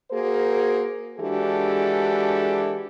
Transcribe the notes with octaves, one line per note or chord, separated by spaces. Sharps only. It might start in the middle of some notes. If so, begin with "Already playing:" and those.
A#3 F#4 G#4 A#4 C5
E3 G#3 D4 F#4 G4 A4